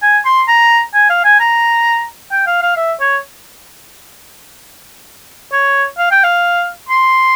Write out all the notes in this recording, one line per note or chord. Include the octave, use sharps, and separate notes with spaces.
G#5
C6
A#5
G#5
F5
G#5
A#5
G5
F5
F5
E5
C#5
C#5
F5
G5
F5
C6